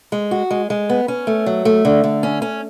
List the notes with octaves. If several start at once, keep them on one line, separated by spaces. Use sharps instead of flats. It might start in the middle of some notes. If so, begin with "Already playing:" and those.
G#3
F#4
G#3
G#3
B3
C#4
A3
F#3
A3
D3
D3
C#4
C#4